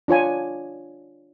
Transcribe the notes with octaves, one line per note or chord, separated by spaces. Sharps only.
D4 F4 C#5 G#5